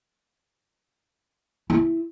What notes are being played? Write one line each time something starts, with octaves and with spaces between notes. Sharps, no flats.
E4